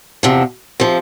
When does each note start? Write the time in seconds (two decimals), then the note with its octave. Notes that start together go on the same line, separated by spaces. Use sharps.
0.23 E2 C3 F3
0.80 C3 F3